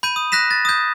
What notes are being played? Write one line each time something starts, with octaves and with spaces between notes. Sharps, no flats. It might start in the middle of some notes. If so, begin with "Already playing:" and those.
B5 G6 D#7
D#6
F#6 A#6 B6 E7
A6
D#6 G6